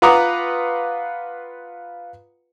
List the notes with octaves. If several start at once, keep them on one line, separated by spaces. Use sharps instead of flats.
F4 B4 F#5 A#5 D6 D#6